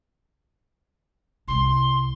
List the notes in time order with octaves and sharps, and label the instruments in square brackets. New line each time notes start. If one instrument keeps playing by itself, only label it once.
[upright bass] C2 [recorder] C6